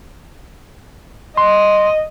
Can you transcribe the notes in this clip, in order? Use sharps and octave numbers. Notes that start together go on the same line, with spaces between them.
D#5 C6